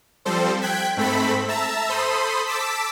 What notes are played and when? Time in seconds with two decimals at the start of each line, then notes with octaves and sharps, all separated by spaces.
0.25 F3 G3 C4 A4 C5
0.61 G5 F#6 G#6 B6
0.97 G#2 A3 C4 A4 B5 B6
1.48 E5 A5 A#5 E6
1.89 A4 C5 B5 C6 D#6
2.47 A5 D6 E6 B6